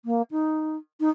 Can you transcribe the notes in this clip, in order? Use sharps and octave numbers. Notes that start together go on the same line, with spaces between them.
A#3
D#4
D#4